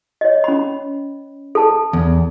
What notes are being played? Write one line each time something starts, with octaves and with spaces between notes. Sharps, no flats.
C#5 D#5
C#4 B5
A4 A5
E2